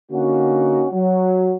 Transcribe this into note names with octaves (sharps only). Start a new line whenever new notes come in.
D3 A#3 C#4 D#4 F#4
F#3